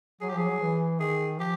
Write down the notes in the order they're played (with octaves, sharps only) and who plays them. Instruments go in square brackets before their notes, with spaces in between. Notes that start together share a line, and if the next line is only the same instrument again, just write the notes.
[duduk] F#3 [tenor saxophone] G#4
[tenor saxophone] G4
[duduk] F3 [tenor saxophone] G#4
[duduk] F#3
E3
[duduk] D#3 [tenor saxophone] G#4
[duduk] F3 [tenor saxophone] G4